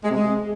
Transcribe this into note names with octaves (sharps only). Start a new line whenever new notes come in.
G#3
C3
G#3